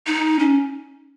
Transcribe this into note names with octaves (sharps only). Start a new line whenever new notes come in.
D#4
C#4